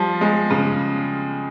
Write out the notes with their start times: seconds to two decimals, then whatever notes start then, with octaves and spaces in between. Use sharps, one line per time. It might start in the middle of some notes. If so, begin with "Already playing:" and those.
Already playing: F3 G3
0.21 G#3
0.50 C#3